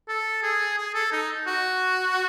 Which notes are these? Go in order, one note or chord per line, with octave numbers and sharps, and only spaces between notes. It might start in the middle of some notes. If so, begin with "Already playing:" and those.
A4
G#4
G#4
A4
D#4
F#4